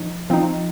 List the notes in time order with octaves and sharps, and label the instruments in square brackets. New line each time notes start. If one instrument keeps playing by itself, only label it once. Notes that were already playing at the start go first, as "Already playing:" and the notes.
Already playing: [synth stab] F3 D#4
F3 C4 D#4